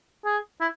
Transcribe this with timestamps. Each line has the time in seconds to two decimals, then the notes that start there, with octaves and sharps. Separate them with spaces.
0.25 G#4
0.60 E4